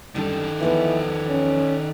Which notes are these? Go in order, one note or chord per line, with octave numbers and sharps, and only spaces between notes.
F#2 D3 D#3 G3 A4
E2 E3 F3 B3
C#4